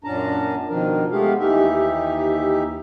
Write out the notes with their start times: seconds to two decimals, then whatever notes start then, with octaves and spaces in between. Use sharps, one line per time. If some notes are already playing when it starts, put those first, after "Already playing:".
0.04 F#2 A#2 C#4 D4 A5 A#5
0.69 B2 D#3 F3 D4 A#4
1.11 G#3 A3 B3 G4 G#4 F5
1.39 D#2 E3 D#4 G4 E5